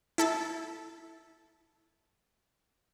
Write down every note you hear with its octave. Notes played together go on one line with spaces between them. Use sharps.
E4 A4 A5